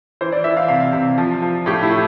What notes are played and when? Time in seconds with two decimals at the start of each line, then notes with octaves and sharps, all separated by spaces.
0.21 E3 C5
0.32 D5
0.44 E3 E5
0.57 F5
0.68 C3 F5
0.93 C3
1.18 F3
1.42 F3
1.66 A2 G4
1.83 E4
1.90 A2